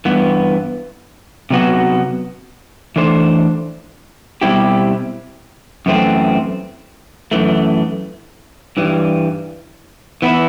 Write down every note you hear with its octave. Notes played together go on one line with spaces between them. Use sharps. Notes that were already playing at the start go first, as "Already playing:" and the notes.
G2 E3 B3
C3 F#3 B3 F#4
E3 A3 D4 A4 C5
B2 G3 C4 E4 G4
F#2 E3 A3 C4
F#2 E3 A3
G2 E3 G3
E3 B3 E4